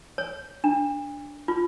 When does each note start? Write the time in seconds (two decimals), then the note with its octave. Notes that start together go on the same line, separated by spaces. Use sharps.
0.18 C#5
0.64 D4
1.48 F4